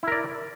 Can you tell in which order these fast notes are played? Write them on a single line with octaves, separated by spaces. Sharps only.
E4 A#4 D5